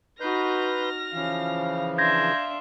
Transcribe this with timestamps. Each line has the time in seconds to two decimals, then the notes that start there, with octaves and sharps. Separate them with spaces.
0.20 D#4 F#4 B4 C6 F6 G6 A#6
1.13 C#3 E3 F3 F5
1.98 D4 E5 F5 C6 G6 G#6 A#6